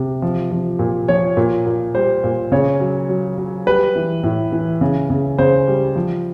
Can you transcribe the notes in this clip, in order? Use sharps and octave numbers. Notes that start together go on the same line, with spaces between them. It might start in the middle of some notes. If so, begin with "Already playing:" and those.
Already playing: C3
F3
F3
A#2
F3 C#5
A#2
A#2
G3 C5
A#2
C#3 C#5
F#3
F#3
F#3
G3 B4
E3
A2
E3
C#3
C#3
C#3 C5
G3
F3